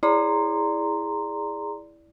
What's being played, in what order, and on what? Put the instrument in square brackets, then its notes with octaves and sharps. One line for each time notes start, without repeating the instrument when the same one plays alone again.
[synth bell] E4 D5 [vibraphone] G#4 A#5 C6